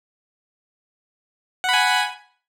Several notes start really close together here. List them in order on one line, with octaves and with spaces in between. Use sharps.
F#5 B5 G#5